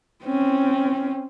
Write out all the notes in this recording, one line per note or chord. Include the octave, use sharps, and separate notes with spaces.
C4 C#4